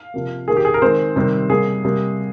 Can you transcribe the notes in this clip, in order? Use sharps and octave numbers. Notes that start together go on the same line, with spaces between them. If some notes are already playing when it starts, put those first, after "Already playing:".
Already playing: F5
C3 F3 A#3
D#3 A#3 G#4
G4
G#4
A#4
D#3 G#3 C4 C5
C3 D#3 G3 C4
C3 G3 A#3 G#4
C3 G3 A#3